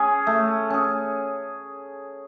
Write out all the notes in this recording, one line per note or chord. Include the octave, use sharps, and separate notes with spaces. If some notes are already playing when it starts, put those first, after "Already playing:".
Already playing: C#4 G#4
A3
C#4 G#4